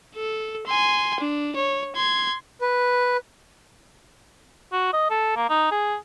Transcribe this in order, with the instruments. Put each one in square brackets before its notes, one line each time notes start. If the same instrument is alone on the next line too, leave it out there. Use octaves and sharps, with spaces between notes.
[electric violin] A4
G#5 C6
D4
C#5
C6 G#6
[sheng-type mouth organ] B4
[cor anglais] F#4
D#5
A4
A#3
D#4
G#4